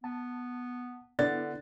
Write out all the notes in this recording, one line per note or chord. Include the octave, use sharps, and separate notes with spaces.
B3 A5
D3 B3 D4 E4 D5 F#5 A6